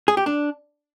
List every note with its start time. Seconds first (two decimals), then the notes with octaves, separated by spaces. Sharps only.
0.08 G#4
0.17 G4
0.26 D4